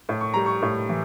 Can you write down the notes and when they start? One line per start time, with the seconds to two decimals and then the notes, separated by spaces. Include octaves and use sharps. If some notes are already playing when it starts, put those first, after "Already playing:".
0.09 A2
0.21 C#6
0.34 G3 A#5
0.46 C#6
0.62 A2
0.89 E3